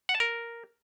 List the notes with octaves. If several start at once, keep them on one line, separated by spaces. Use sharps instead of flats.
F#5
A5
A#4